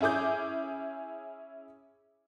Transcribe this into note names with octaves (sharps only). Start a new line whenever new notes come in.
C#4 E4 G#4 D6 G6